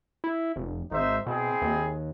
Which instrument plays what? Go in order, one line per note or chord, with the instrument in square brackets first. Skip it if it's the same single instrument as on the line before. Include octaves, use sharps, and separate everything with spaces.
[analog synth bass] E4
F1
[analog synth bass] G#1 [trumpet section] D#4 C5 E5
[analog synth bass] B2 [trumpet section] C4 E4 G#4
[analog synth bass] D#2